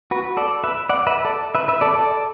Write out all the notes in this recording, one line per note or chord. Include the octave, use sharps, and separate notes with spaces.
F#4 B4
A4 D5
B4 E5
D5 F#5
B4 E5
A4 D5
B4 E5
B4 E5
A4 D5
A4 D5